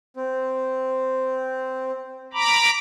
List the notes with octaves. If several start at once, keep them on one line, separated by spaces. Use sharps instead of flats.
C4
A#5 B5 D6